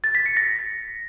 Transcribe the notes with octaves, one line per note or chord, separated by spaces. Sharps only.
A6
B6
C#7
A#6